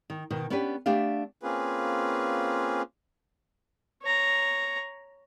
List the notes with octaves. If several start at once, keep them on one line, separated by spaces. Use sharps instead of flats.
D#3
B2 D#3
B3 C#4 D4 G4 B4
A3 B3 D4 G4 F5
A#3 C4 C#4 F4 G#4 B4
C#5 A#5